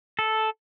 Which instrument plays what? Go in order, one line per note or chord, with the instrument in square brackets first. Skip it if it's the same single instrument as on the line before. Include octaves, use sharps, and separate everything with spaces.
[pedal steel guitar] A4